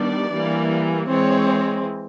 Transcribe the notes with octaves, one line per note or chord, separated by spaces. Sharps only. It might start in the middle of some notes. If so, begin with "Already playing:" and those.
Already playing: D#3 G3 B3 D4 D5
E3 G3 A#3
E3 G#3 C4 C#5